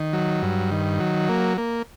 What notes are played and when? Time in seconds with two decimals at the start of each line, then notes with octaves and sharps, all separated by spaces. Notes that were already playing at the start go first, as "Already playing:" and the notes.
Already playing: D#3
0.13 F#3
0.42 G2
0.72 D#3
1.00 F#3
1.29 A#3
1.58 A#3